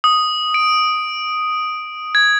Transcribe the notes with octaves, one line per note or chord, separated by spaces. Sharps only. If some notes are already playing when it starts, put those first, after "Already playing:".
D#6
D7
G#6